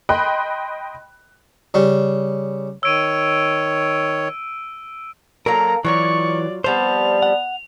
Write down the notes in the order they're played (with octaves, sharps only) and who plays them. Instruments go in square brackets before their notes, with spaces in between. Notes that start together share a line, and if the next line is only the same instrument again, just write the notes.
[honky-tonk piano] D#5 G5 B5 C6 F#6
[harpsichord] C#3 G3
[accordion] D#3 C#5 [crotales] E6 D7 D#7
[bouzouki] F#3 A#3 F4 [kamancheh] A4 A#5 [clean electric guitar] A#4
[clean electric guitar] E3 [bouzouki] F#3 F4 C#5 [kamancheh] D5 [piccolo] C#6
[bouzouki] F3 G3 C4 [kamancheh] B3 A5 [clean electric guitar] C5 [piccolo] F7
[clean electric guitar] F#5